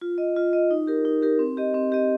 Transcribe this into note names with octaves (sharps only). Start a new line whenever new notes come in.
F4
D#5
F4
D#5
D#4
G4 A#4
D#4
G4 A#4
C4
G4 D#5
C4
G4 D#5